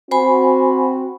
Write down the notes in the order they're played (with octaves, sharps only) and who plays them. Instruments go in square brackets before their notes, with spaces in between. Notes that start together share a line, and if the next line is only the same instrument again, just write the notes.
[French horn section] C4 F#4 [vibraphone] C5 G#5 B5